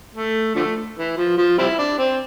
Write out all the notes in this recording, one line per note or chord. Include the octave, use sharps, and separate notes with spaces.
A3
D3 F3 A3
E3
F3
F3
G3 C4 E4
D4
C4